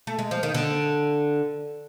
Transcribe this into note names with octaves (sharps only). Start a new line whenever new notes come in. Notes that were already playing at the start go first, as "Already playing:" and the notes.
A3
G#3
F3
D#3
D3